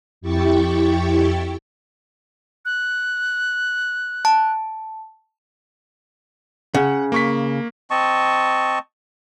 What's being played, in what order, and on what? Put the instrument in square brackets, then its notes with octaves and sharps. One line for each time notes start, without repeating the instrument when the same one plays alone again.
[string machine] F2 E4 G4 G5 C#6 A6
[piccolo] F#6
[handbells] A5
[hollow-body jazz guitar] C#3 [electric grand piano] F#5
[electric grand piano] A#3 C#6 B6
[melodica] C4 D#5 A5 C#6